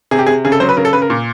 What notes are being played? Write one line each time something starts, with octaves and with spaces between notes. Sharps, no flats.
C3 G#4
G4
C3 G#4
C#3 G#4
A4
F#3 C5
B4
C#3 A#4
A4
C#3 B4
A#4
A#2